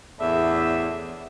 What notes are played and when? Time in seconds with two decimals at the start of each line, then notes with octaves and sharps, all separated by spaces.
0.19 E2 A2 D4 E5